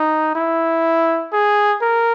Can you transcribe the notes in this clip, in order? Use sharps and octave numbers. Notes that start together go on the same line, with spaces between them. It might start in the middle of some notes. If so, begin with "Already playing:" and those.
Already playing: D#4
E4
G#4
A#4